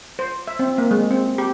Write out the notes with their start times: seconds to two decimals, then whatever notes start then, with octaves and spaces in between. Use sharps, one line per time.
0.19 C5
0.47 E5
0.59 C4
0.78 A#3
0.91 G#3
1.11 C4
1.38 G4